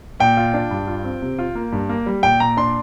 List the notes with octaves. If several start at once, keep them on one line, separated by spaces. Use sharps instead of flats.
A#2 G5
F4
D4
G2
F4
C4
C3
F4
A#3
G2
A#3
G3
A#2 G5
A#2 A#5
D4 C6